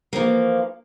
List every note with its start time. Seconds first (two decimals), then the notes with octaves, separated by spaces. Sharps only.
0.13 E3 F3 A#3